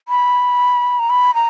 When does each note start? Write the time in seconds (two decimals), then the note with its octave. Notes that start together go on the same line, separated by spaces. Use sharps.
0.08 B5
0.99 A#5
1.10 B5
1.34 A#5